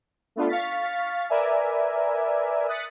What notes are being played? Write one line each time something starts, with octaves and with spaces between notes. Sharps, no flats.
A3 B3 D4 F4 A4
F5 C#6 F6 A6 B6
A#4 B4 D5 E5 G#5
D#6 F#6 A6 B6 C#7